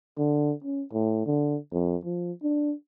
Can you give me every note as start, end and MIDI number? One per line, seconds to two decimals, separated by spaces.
0.18 0.52 50
0.64 0.82 61
0.93 1.22 45
1.26 1.57 50
1.72 1.96 41
2.05 2.32 53
2.43 2.73 62